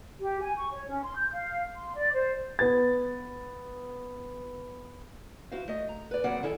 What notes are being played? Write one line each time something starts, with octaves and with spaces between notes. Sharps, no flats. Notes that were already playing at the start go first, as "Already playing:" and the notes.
G4
G#5
C#6
C#5
C#4
C6
G6
F5
C6
D5
C5
B3 B4 A6
E4 F#4 C5 F5
A3 D#5
A#5
B4 D5
C#3 F#3 A#3 C4 D5 F#5
D#3 E4 A4 G#5